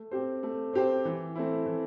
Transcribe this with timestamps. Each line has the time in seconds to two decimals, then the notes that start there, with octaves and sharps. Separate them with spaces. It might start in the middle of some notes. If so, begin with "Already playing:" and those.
Already playing: A3
0.11 C4 G4 C5
0.43 A3
0.73 C4 G4 C5
1.05 E3
1.36 A3 C4 E4
1.66 E3